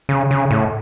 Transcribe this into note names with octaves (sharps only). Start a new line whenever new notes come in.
C#3
C#3
A2